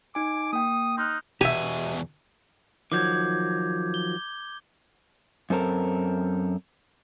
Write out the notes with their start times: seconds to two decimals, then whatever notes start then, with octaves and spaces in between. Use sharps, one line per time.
0.15 D#4 G#5 D6
0.53 A#3 G5 D#6
0.98 D#4 C6 F6 F#6
1.41 E2 B2 G4 E5 G#5
2.92 D#3 F3 F#3 D6 G6 G#6
3.94 G7
5.50 F#2 C4 A4 A#4